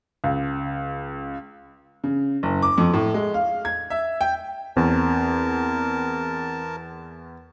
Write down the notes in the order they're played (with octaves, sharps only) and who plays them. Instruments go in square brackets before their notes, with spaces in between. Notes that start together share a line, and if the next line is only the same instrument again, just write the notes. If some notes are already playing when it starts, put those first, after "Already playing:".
[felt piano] C#2
[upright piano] C#3
F#1
D6
F2
A2
G#3
F5
G#6
E5
G5
[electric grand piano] E2 [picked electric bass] C4 [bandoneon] A#4 A5